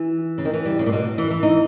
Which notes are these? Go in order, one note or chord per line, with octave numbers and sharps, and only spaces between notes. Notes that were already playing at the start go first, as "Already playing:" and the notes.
Already playing: E3
C#3
D#3
E3
G3
C#3
A#2
B2
E3
E3
D#4